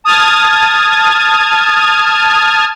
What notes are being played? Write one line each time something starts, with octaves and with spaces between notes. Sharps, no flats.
A5 D#6 F6 G#6 A6